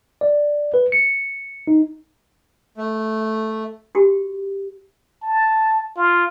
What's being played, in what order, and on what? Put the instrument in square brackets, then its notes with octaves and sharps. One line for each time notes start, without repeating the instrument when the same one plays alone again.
[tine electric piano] D5
B4
C#7
D#4
[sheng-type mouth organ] A3
[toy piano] F#4 G4
[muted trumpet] A5
F4